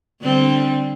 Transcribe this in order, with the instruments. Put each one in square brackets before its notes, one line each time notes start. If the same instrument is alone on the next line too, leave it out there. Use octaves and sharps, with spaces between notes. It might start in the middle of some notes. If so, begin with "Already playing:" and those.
[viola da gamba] D3 G3 C4